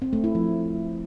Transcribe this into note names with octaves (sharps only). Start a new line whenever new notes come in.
C4
A3
E4
F3